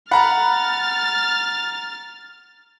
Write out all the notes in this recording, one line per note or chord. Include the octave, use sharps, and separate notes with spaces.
A4 F#5 A#5 B5 F6 A6